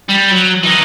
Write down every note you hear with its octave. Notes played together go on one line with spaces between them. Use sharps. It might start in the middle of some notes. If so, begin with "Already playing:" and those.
G3
F#3
E3 D#4